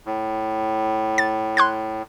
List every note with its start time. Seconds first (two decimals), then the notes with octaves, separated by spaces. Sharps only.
0.06 A2
1.18 A6
1.57 C6 F#6 G#6